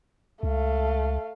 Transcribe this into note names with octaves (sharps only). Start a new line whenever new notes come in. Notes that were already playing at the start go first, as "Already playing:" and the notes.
C#2 A3 F5